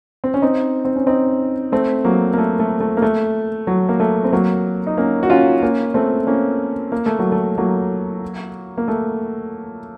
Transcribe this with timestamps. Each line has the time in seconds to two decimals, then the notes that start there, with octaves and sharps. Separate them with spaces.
0.24 C4
0.34 C#4
0.42 C4 D#4
0.85 C4
0.96 C#4
1.07 C4 D#4
1.72 A3 C4
2.05 F#3 A#3
2.33 A#3
2.38 A3
2.59 A3
2.80 A3
2.97 A#3
3.02 A3
3.67 F#3
3.89 A#3
4.00 A3
4.24 C4
4.33 F#3 A#3
4.87 D#4
4.97 A#3 C#4
5.23 F#4
5.30 C#4 F4
5.63 A#3 C#4
5.94 A3 C4
6.27 A#3 C#4
6.92 A#3
7.06 A3
7.19 F#3
7.32 A3
7.58 F#3 A#3
8.78 A#3
8.88 A3